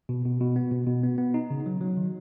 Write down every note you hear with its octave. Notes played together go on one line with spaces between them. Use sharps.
B2
B2
B2
B3
B2
B2
B3
B3
D#4
C#3
F#3
F#3
D#3